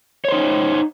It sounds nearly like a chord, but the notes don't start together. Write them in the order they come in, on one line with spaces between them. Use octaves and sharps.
C#5 C5 D#4